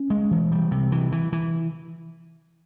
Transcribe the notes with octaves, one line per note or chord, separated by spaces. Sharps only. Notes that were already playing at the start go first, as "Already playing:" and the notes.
Already playing: C#4
G#3
E3
G3
C3
E3
E3
E3